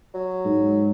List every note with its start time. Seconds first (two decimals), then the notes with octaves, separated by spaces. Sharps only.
0.14 F#3
0.45 G#2